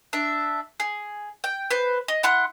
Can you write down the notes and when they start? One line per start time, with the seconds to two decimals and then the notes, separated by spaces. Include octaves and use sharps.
0.13 D4 E5
0.80 G#4
1.44 G5
1.71 B4 C5
2.08 D#5
2.23 E4 F#5 C6 F#6